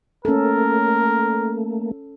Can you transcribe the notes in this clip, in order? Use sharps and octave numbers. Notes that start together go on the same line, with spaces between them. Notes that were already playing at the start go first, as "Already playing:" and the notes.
A3 A#3 C#4 A4 A#4